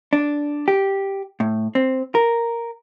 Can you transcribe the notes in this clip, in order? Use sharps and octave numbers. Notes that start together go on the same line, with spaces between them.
D4
G4
A2
C4
A#4